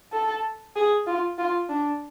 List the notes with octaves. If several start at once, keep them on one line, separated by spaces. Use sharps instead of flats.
A4
G#4
F4
F4
D4